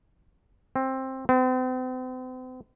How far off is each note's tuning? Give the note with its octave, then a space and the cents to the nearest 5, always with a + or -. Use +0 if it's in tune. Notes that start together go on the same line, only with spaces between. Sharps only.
C4 +15
C4 -40